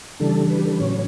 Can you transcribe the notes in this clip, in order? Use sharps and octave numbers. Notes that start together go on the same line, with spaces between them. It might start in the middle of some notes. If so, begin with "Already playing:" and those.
C#3 E3 G3 D4 A4
B4
G4
A4
B4
A2 F#3 C#4 C#5